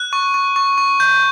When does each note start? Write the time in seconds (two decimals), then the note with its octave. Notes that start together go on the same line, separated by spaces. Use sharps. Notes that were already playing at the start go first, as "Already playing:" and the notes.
Already playing: F#6
0.13 C#6
0.34 C#6
0.56 C#6
0.78 C#6
1.00 G6